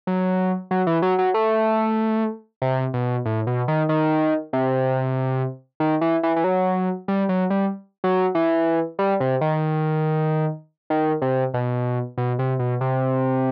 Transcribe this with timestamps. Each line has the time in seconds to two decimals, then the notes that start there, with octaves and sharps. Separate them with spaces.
0.07 F#3
0.71 F#3
0.87 E3
1.02 F#3
1.19 F#3
1.34 A3
2.62 C3
2.94 B2
3.26 A2
3.47 B2
3.68 D#3
3.89 D#3
4.53 C3
5.80 D#3
6.01 E3
6.23 E3
6.36 E3
6.44 F#3
7.08 G3
7.29 F#3
7.50 G3
8.04 F#3
8.35 E3
8.99 G3
9.20 C3
9.41 D#3
10.90 D#3
11.22 C3
11.54 B2
12.18 B2
12.39 C3
12.59 B2
12.81 C3